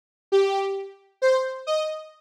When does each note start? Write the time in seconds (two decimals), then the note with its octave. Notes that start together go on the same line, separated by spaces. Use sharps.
0.32 G4
1.22 C5
1.67 D#5